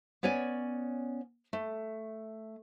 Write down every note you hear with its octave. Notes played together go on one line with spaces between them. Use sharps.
B3 C#4 C#5 D5 G#5
A3